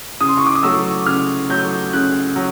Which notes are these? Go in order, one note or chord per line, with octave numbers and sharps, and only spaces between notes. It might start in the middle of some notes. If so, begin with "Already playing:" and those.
C#3 D#6
C6
C#6
D6
D#6
F#3 A3 E6
C#3 F6
F#3 A3 G6
C#3 F#6
F#3